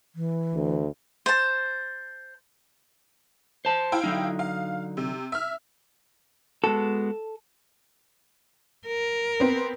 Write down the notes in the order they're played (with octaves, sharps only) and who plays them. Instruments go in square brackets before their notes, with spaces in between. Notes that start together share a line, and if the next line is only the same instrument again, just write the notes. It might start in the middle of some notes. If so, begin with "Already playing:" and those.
[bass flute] E3
[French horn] D2
[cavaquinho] C5 A5
[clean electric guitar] C5 A5
[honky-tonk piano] E4 F5 G5
[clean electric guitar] D3 F#3 D#4
[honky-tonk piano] F5
C3
E5 F6
[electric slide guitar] G#3 B3 F#4 [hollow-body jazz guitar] A4
[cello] A#4
[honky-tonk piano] B3 C4